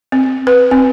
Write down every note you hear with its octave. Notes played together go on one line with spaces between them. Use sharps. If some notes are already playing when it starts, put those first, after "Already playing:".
C4
B4
C4